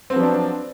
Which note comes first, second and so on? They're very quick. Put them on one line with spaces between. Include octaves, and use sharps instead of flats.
C4 B3 F3 F#3 D4